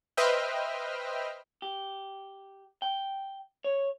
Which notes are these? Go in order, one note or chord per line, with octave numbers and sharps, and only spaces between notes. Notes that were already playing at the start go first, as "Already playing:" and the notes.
B4 C5 D#5 E5 G5 F6
G4
G5
C#5